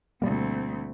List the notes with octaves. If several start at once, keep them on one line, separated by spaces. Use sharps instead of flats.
D2 B2 G3 A#3 C4